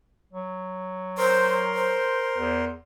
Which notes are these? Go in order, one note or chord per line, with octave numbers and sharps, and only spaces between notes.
F#3
A#4 C5 C6
C5
E2